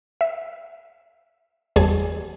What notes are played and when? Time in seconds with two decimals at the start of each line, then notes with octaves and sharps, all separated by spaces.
0.21 E5
1.76 G1 E2 G3 G#4 A5 G#6